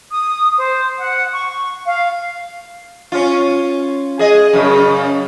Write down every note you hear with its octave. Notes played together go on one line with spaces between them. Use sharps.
D#6
C5
F#5
C#6
F5
C#4 F4
G#4 D#5
F#2 C#3